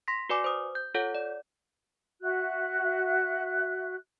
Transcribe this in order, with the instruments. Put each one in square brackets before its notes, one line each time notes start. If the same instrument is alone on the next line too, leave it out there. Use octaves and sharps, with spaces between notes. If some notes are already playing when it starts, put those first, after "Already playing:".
[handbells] C6 A#6 B6
F#4 B4 D5 G#5 D6
C5 D#6
G6
F4 A4 C#5 F#5 G6
D5
[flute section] F#4 E5 F#6